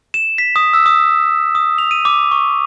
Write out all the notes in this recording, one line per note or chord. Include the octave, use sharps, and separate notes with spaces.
E7
B6
D#6
E6
D#6
D#6
F7
D#7
D6
C#6